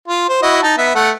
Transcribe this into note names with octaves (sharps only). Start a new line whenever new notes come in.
F4
C5
E4 F#4 D#5
D#4 A5
B3 E5
A3 F#5